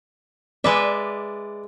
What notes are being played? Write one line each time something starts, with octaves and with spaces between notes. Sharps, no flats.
G#3 B4 D5 E5